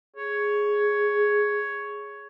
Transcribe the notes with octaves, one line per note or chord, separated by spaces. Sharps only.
G#4 C#5